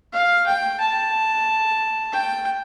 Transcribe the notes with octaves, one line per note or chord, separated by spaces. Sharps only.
F5
G5
A5
G5